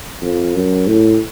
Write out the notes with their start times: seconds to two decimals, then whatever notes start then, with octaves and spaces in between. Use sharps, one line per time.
0.22 F2
0.55 F#2
0.87 A2